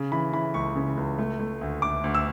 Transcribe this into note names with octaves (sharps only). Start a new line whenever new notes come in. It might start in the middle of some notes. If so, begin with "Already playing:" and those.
Already playing: C#3
E3 B5
E3 B5
C#2 C#6
C#3
C#2
A3
A3
D2
D2 D6
D2
E6